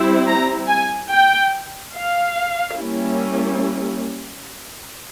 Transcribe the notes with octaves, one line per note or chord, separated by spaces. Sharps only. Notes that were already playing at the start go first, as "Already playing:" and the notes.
Already playing: G3 C4 E4
A#5
G#5
G5
F5
G3 A#3 C#4 E4